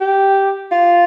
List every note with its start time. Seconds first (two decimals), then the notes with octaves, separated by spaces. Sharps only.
0.01 G4
0.71 F4